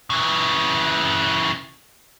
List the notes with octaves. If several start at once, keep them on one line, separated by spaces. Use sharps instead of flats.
C#3 E3